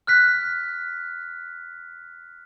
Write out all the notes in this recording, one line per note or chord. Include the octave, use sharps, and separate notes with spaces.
F6 F#6 B6